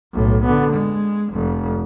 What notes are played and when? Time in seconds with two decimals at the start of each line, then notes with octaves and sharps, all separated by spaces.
0.14 B1 A2
0.45 D3 B3
0.73 G#3
1.31 F1 F2